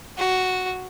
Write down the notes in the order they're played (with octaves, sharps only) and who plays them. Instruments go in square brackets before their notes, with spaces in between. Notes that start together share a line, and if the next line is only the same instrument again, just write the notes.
[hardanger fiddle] F#4